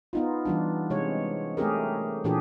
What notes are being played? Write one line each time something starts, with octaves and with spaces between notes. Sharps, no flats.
B3 D#4 F4
E3 G3 D4
C3 G#3 C#5
A3 C#4 G4 G#4 A#4
A#2 E3 D4 G4 G#4